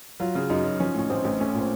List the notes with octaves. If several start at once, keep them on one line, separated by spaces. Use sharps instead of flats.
F#3 F4
C#3
F#2 D#4
F#2
F3 C#4
A2 C#4
A1 C4
A1
A3 C#4
A#2
C4